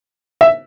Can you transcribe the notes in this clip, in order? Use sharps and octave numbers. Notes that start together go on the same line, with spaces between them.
E5